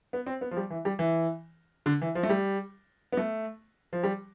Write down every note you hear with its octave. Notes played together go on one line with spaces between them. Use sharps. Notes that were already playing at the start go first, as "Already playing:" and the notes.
B3
C4
B3
F3
G3
E3
G3
E3
D3
E3
F3
A3
G3
B3
A3
F3
G3